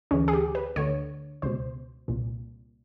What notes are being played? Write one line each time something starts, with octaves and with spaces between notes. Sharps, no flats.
D2 C#3 E3 C#4
G#4
G4
B4
D2 D3 C#5
C#2 B2 C5
C2 A#2